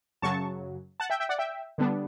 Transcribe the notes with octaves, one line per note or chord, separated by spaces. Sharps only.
F#2 C#3 F#3 A5 C#6
F#5 A5
E5 G5
E5 G5
D5 F#5
E5 G5
D3 G3 B3 D4